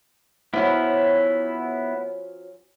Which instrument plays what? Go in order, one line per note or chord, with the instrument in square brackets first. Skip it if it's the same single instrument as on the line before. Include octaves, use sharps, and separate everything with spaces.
[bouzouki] F3 F#3 C#4 [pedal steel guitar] B3 E4